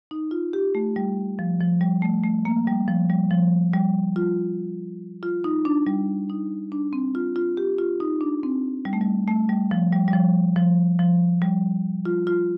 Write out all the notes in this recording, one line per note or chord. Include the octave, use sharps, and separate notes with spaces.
D#4
F4
G4
A3
G3
F3
F3
G3
A3
A3
A#3
G3
F3
G3
F3
G3
F4
F4
D#4
D4
G3
D#4
D4
C4
F4
F4
G4
F4
D#4
D4
C4
G3
A3
G3
A3
G3
F3
G3
G3
F3
F3
F3
G3
F4
F4